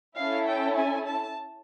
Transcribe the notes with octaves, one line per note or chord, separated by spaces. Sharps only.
C#4 E4 A4 F5
G5
G#5
A5